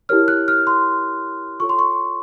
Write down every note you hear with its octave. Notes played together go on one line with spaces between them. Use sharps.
E4 G4 A#4 C#5 F6
F#6
F6
C6
F4 A4 C#5 C#6
C6
C#6